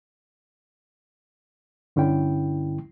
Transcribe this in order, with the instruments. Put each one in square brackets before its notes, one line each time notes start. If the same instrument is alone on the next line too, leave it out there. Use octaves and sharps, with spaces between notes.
[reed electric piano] G2 D3 C#4 E4 G5